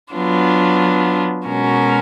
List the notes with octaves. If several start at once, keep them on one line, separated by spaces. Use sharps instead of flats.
F#3 B3 D4 F4
B2 G#3 C#4 F#4 A#4